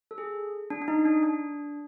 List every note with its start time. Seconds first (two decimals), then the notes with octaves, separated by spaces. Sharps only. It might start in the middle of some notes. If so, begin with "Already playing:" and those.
0.11 A4
0.18 G#4
0.70 D4
0.82 D4
0.88 D#4
1.05 D4
1.23 D4